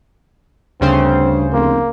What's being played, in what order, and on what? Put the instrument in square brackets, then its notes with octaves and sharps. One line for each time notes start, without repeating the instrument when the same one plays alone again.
[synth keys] D2 C#3 C5 [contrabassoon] G2 [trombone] C4
[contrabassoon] F1 [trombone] A#3